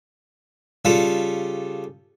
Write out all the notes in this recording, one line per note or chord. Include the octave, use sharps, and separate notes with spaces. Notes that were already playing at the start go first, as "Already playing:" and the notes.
C#3 G3 F4 A4